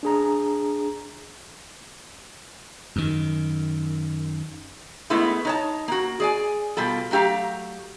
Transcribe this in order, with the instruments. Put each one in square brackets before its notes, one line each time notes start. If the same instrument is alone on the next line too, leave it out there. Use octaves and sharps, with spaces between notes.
[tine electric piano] D4 G#4 A#5
[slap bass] F#2 D#3
[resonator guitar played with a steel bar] G#3 A3 B3 E4
D#4 C#5 A5
A#3 F#4
G#4 D5 G#5
B2 G3 F4 A4
F#3 A3 G4 F5 A#5